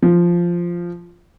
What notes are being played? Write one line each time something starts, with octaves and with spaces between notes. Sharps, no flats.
F3